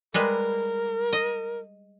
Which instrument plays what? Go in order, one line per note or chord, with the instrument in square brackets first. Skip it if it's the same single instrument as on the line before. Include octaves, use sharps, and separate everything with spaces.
[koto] G3 G#3 B4 [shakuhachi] A#4
[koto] D#5